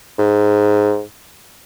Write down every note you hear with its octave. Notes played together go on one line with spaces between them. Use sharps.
G#2